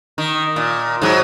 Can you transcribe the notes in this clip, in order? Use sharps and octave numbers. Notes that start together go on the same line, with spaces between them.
D#3
A#2
G#2 F#3